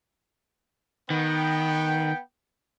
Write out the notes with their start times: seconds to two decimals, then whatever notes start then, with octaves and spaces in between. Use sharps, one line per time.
1.10 D#3 B3 G5